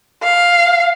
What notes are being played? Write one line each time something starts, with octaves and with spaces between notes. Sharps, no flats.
F5